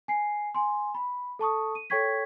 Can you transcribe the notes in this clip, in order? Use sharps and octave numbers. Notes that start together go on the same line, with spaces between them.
G#5 C7
G#5 C6
B5
A4 A5 C#6 D#6
D#7
A4 C#5 G5 C#6 G#6 B6